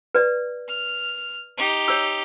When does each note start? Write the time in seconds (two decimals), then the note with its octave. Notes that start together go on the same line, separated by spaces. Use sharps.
0.15 B4 D5
0.68 F6
1.57 D#4 G4
1.88 C#5 E6